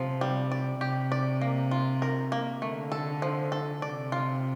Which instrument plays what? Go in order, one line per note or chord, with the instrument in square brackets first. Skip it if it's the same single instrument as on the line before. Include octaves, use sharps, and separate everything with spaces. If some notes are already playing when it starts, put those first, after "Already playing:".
Already playing: [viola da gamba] C3 [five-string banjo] F3
[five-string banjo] G3
D5
[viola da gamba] C3 [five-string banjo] G4
[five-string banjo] D5
A#3
F4
A#4
A#3
[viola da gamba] D3 [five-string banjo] A3
[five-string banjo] A4
F3
A4
[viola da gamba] C3 [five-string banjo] D5
[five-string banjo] F4